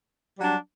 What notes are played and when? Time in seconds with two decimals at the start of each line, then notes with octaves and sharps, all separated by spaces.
0.37 G3
0.40 F#3
0.43 D4